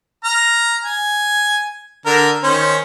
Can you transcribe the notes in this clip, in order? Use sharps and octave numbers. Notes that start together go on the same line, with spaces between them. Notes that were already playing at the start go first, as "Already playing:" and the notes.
A#5 F6
G#5
D3 A#4
D#3 C#4 C5